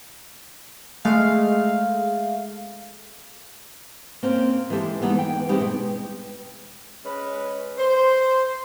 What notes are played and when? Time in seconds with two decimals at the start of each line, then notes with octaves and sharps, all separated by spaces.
1.05 G#3 A3 F5
4.23 A#3 C4 C#4 A#4
4.70 E3 G#3 G4 A4
5.01 G3 G#3 B3 C4 D#4
5.15 E3 G5
5.49 G3 G#3 C4 D#4 E4 G4
5.60 B2
7.05 G#3 C#4 B4
7.79 C5